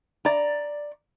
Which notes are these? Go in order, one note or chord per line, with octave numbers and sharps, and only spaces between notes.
D5 A#5